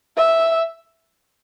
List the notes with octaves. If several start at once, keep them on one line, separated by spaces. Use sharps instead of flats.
E5